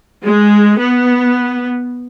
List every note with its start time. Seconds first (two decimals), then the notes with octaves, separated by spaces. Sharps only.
0.24 G#3
0.79 B3